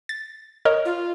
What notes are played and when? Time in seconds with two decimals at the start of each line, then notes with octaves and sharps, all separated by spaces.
0.09 A6
0.65 A#4 C#5 D#5
0.85 F4